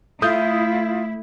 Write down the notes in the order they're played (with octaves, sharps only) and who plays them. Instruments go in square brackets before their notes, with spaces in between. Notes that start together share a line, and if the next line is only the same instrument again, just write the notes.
[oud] A3 [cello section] E4 [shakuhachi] F4 [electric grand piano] D#6 G6